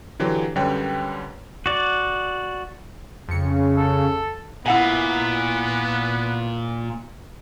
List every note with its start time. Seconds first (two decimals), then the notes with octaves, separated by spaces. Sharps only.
0.19 D3 E3 F#3 G4
0.56 F#2 D3 G3 B4 C#5 G5
1.66 F#4 D5
3.28 F2 C#3 C#7
3.76 A4
4.66 A#2 B3 E4 F#5 G#5